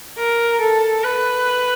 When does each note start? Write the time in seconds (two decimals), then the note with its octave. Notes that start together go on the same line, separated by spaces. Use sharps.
0.18 A#4
0.61 A4
1.04 B4